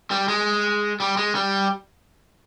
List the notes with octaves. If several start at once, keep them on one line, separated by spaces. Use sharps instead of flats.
G3
G#3
G3
G#3
G3